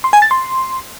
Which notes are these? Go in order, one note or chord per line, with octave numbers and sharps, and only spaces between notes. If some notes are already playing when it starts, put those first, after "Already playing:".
C6
G#5
A6
C6